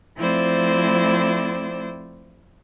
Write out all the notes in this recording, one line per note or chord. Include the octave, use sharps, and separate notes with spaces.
F3 A3 C4 E4 C5 D5